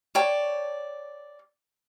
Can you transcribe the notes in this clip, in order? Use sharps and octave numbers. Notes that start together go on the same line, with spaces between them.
C#5 D5 G5 A5